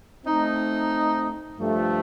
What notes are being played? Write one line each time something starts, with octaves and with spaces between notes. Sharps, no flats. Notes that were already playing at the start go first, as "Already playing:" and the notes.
A3 C4 D#4
G2 F3 A3